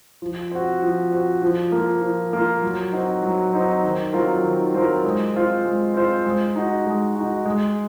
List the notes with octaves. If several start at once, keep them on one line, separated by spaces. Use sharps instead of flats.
F3
C4 F#4
F3
C4 F#4
F3
A#3 F4
F3
A#3 F4
F#3
C4 D#4 F#4
F#3
C4 D#4 F#4
D#3
F#3 C4 F4 A#4
D#3
F#3 C4 F4 A#4
G#3
C4 F4 C5
G#3
C4 F4 C5
G#3
D#4 F#4
G#3
D#4 F#4
G#3